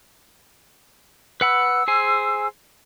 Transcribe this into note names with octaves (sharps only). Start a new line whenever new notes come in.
B4 F#5 B5 E6
G#4 C5 G#5